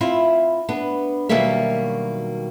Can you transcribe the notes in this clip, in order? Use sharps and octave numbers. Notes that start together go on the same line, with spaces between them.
C4 E4 F4
B3 D4
B2 D#3 F#3 G3 A#3 E5